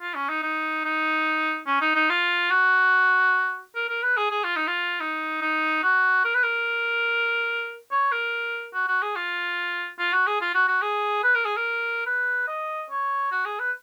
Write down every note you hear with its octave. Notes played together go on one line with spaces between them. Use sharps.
F4
C#4
D#4
D#4
D#4
C#4
D#4
D#4
F4
F#4
A#4
A#4
B4
G#4
G#4
F4
D#4
F4
D#4
D#4
F#4
A#4
B4
A#4
C#5
A#4
F#4
F#4
G#4
F4
F4
F#4
G#4
F4
F#4
F#4
G#4
B4
A#4
G#4
A#4
B4
D#5
C#5
F#4
G#4
B4